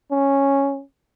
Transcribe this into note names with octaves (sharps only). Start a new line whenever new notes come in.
C#4